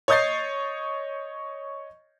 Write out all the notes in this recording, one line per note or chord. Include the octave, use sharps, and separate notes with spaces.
C#5 D#5 D#6 G6 A6 C7